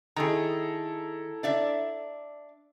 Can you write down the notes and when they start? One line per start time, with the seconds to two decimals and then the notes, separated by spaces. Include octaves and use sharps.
0.16 D#3 E4 G#4 A4 A#5
1.43 D4 D5 E5